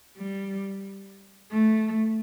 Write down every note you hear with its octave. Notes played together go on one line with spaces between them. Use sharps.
G3
A3